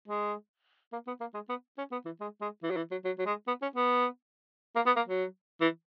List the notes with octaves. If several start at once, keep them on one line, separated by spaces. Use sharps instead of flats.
G#3
A#3
B3
A#3
G#3
B3
C#4
B3
E3
G#3
G#3
E3
F#3
E3
F#3
F#3
F#3
G#3
B3
C#4
B3
A#3
B3
A#3
F#3
E3